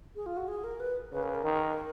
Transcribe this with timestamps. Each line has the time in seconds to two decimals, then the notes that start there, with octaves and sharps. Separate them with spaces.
0.15 G#4
0.26 F4
0.37 F#4
0.48 G#4
0.64 A#4
0.80 B4
1.12 C#3 B4
1.23 A#4
1.29 B4
1.34 A#4
1.44 D#3